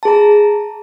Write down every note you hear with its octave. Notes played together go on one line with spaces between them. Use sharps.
G#4 A5 A#5